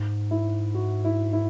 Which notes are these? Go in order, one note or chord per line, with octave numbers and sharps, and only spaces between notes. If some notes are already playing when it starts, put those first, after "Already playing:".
Already playing: G#2
E4
F#4
E4
E4